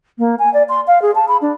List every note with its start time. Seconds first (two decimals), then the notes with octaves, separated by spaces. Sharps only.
0.19 A#3
0.39 G#5
0.54 D5
0.69 C6
0.87 F5
1.02 G#4
1.15 A5
1.28 B5
1.42 D4